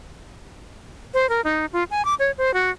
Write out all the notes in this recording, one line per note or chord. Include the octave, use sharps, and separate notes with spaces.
C5
A#4
D#4
F4
G#5
D6
C#5
C5
F#4